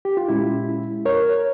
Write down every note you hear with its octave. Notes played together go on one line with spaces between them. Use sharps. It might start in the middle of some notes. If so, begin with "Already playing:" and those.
G4
F4
A#2 G#3 C#4 E4
A#4 C#5